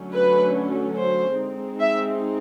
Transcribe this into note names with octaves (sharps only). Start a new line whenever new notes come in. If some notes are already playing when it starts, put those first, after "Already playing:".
Already playing: D3 F#3 A3 C#4
B4
C5
G#3 C4 D#4
E5